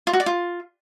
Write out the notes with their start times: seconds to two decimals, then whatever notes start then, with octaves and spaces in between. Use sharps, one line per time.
0.07 F4
0.13 F#4
0.20 D5
0.26 F4